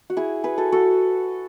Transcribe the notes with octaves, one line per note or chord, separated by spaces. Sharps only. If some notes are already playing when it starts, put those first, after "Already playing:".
F#4
E4 G#4
G#4 B4
F#4 A4
F#4 A4